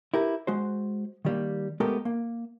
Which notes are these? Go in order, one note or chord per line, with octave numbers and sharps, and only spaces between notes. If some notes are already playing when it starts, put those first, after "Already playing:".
E4 G4 A#4 B4
G#3 F#4 C5
D#3 G3 A#3
G#3 A3 B3 G4 A4 A#4
A#3